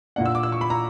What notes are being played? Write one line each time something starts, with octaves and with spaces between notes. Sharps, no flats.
A#2 A#3 D4 F#5
E6
D6
E6
C#6
B5
A#5